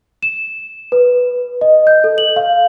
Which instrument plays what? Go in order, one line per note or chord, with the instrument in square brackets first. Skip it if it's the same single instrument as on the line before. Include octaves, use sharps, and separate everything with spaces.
[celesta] E7
B4
D#5
G6
A4
F#7
F5